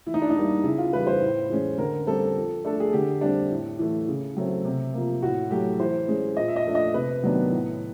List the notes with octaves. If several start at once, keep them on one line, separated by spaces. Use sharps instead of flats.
E3 E4
D#4
D4
D#4
G3 A#3 D4
C#3 E4
F4
E3 G3 B4
C5
A2
E3 G#3 C#4
D3 A#4
G3 C4 A4
F3
A3 D4 A4
G#4
D3 G4
G3 C4 D4
A2
E3 A3
C#3
F#3 A3 C4
C3
F3 A#3
A2 F#4
F#3 A3 G4
E3 C5
G#3 C#4
A#2 D#5
E5
D#5
F3 A3 D4
D#5
C3 B4
D#3 F#3 B3 D4
A2